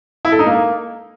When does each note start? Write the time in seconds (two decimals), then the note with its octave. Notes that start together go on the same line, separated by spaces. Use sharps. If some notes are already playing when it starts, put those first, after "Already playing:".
0.25 E4
0.32 A4
0.39 D#4
0.46 A#3